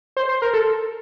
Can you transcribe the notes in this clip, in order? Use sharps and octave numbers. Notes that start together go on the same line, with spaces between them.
C5
C5
A#4
A4